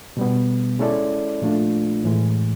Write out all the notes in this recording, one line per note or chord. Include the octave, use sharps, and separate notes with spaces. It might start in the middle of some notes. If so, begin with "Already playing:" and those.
B2 G3 B3
G#3 C#4 E4 A4 D5
A#2 F3 A3 D4 F4
A2 E3 G#3